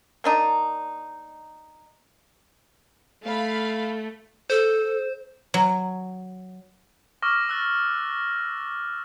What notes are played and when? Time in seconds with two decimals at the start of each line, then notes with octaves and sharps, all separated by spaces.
0.24 A#3 D4 D#4
3.24 A3 F5 B5
4.50 A4 C5
5.54 F#3
7.22 C#6 D6 E6 F6 A#6
7.49 E6 F#6 A6